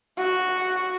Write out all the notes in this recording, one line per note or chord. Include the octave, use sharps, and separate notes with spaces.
F#4